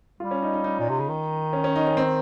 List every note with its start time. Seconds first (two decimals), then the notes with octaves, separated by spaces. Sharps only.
0.20 G3 F4
0.31 C#4
0.42 D#4
0.54 D#4
0.64 D#4
0.79 A#2
0.89 C3
0.99 C#3
1.09 D#3
1.53 C#4
1.64 C#4
1.76 D#4
1.87 C#4
1.97 C4